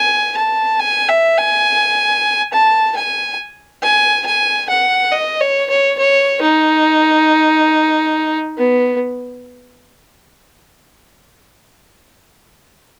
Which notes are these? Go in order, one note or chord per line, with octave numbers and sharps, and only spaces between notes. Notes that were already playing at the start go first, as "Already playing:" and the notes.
Already playing: G#5
A5
G#5
E5
G#5
A5
G#5
G#5
G#5
F#5
D#5
C#5
C#5
C#5
D#4
B3